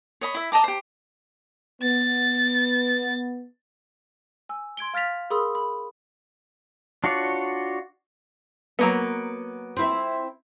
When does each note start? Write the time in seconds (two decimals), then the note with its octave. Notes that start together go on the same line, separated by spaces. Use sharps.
0.21 C#5 D#5 B5
0.34 E4 E5
0.52 D#5 A5 A#5 D6
0.64 G4 C5
1.82 B3 A6
4.49 G#5 E6
4.77 C6 G#6 D7 G7
4.94 F5 F6 A6 B6 F7
5.30 G#4 A#4 B5 C6 D#6 E6
5.55 B5
7.04 D4 F4 F#4 C#5 D5
8.79 F#3 A#3 B3
9.77 C4 E4 E5